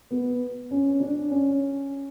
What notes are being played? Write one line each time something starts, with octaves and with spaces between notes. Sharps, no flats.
B3
C#4
D4
C#4